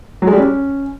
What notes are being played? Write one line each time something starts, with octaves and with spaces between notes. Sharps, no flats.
F#3
G#3
G3
C#4